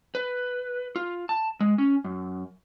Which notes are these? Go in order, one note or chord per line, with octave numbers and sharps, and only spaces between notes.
B4
F4
A5
G#3
C#4
F#2